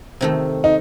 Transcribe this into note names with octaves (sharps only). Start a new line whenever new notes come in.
C3 D#3 A3
D#4